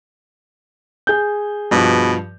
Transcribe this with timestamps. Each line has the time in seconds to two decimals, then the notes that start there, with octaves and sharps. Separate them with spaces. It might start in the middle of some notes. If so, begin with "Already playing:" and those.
1.07 G#4 G6
1.71 G2 B2 F3